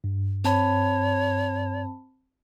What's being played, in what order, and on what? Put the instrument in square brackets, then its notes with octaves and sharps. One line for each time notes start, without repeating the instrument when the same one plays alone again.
[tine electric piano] G2
[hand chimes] C4 A5 B5 [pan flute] C#5